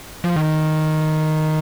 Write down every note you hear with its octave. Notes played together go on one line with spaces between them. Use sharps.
F3
D#3